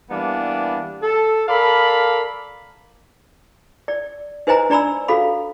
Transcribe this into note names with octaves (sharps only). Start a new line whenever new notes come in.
E3 G3 A#3 B3 D4
A4
A4 A#4 D5 F5 B5
D5
D#4 B4 C5 D#5 G#5 A#5
D4 D5 A#5 B5 E6
F#4 A4 F5 B5